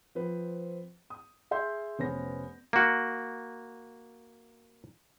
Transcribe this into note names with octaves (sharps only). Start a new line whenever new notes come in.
F3 C4 B4 C5
D#6
G#4 E5 C6 G6
F1 B3 C#4 C5 A#6
A#3 F#4